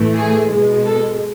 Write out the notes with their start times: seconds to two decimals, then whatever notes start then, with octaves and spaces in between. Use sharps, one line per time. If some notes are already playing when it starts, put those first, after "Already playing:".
Already playing: A2 E3 A3
0.14 G#4
0.50 B2 G#3
0.86 A4